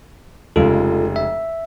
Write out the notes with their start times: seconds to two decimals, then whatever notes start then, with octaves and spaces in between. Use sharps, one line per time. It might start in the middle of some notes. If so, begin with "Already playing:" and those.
0.56 F1 C#3 G#3 F4 A4
1.16 E5